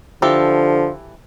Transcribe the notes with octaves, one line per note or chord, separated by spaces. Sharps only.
D3 E3 F3 G4 A4